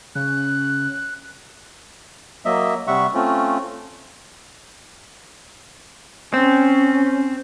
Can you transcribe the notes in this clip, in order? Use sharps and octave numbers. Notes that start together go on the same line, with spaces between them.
C#3 F#6
F#3 A#3 D#5 E5
C3 G3 E5 F#5 C#6
A3 C4 C#4 F4
C4 C#4